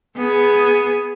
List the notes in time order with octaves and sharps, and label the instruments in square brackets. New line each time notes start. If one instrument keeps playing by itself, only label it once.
[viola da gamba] B3 G#4